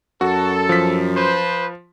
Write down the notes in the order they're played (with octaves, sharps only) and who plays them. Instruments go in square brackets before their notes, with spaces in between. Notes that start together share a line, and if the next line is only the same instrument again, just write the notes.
[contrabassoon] F#2 [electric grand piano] F#4 [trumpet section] A4
[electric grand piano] F3 B6
[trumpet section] B4 C5